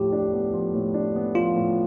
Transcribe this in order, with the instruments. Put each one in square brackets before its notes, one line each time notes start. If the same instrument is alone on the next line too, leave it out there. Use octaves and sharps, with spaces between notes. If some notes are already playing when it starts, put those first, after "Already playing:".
Already playing: [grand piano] A2 F3 [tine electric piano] G4
[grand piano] D4
B3
F3
A2
D4
B3
[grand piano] F3 [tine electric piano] F4
[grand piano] A2